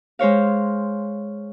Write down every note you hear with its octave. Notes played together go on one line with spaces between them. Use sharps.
G#3 C5 C#5 F5